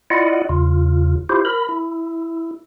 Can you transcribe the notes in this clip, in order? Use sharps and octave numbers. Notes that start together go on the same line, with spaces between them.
E4 F4 D5 D#5 F#5
E2 C#3 F4
E4 F4 G4 C5
A#4 B5
E4